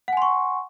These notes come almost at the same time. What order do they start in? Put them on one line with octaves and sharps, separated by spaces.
F#5 G#5 C6 C#6